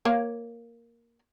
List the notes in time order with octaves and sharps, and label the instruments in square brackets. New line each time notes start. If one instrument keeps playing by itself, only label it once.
[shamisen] A#3 C#5 F5